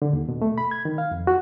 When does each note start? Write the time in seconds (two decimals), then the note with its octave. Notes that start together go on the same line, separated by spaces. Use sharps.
0.02 D3
0.13 D#2
0.29 B2
0.42 A3
0.58 B5
0.71 G#6
0.85 D#3
0.98 F5
1.11 F2
1.27 F#4